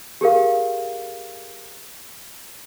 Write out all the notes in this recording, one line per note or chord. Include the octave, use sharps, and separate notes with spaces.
G4 G#4 A#4 F5